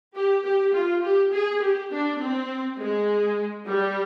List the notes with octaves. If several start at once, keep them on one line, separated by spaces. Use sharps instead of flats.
G4
G4
F4
G4
G#4
G4
D4
C4
G#3
G3